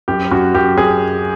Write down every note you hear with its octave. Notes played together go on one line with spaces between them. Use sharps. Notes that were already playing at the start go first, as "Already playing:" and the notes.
F#2 G4
F#2 F#4
F#2 G4
F#2 G#4